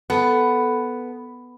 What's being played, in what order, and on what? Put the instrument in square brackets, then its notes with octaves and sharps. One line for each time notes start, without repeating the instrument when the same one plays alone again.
[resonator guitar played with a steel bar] B3 [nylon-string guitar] A4